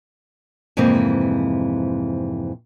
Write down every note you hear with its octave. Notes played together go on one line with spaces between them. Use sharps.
F2 G#2 C3 E3 A#3 C4